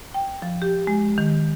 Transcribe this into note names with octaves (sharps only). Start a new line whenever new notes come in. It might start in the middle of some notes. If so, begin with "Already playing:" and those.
G5
F3
G4
G#3
D#3